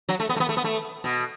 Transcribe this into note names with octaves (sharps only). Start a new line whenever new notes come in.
F#3
A3
B3
A3
B3
A3
B3
A3
B2